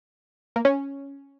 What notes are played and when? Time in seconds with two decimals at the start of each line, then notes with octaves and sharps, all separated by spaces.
0.56 A#3
0.65 C#4